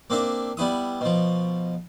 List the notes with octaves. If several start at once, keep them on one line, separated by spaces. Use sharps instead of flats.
A#3 C4 D4 E5
G3 B3 E4 D#6
B2 F3